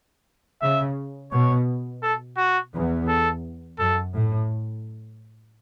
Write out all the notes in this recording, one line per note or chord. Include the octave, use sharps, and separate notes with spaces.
C#3 E5
B2 C#5
A4
F#4
E2
A4
F#2 A4
A2